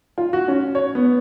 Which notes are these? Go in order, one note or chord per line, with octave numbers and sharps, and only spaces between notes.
F4
F#4
C#4
C#5
B3